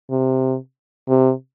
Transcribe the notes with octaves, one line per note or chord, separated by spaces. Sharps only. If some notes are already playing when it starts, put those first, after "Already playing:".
C3
C3